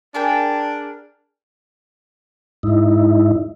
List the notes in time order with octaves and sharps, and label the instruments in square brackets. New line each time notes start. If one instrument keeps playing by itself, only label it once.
[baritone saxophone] D4 [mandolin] G#4 A#4 G5
[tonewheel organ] G#2 D#4 E4